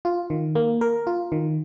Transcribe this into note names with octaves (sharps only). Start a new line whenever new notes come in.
F4
D#3
A#3
A#4
F4
D#3